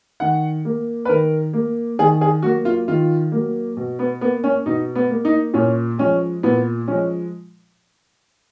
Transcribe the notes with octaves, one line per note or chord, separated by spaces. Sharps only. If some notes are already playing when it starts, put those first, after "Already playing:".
D#3 F#5
A#3
B4
D#3 A#4
A#3
D#3 G#4
G#4
F#3 A#3 F#4
F4
D#3 F4
F#3 A#3
B2
B3
A#3 B3
C#4
B2 D#4
B3
A#3
D#4
A#2 C#4
F3 G#3 C#4
A#2 B3
F3 G#3 C#4